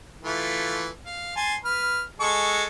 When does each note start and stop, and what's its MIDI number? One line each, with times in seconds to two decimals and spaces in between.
0.23 0.89 52
0.23 0.89 57
0.23 0.89 65
1.06 1.35 77
1.36 1.54 80
1.36 1.54 81
1.36 1.54 84
1.64 2.03 71
1.64 2.03 89
2.20 2.65 56
2.20 2.65 69
2.20 2.65 85